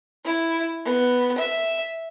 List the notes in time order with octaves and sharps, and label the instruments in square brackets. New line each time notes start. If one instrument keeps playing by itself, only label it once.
[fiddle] E4
B3
E5